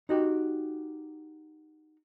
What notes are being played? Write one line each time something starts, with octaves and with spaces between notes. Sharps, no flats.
D#4 F#4 G4